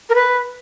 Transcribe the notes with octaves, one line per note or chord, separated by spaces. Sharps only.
A#4
B4